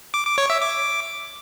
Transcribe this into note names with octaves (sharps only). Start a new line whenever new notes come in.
D6
D6
C#5
E5
D6